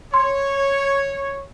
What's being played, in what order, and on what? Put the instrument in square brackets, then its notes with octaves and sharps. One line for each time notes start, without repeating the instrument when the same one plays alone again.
[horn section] C#5 [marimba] C6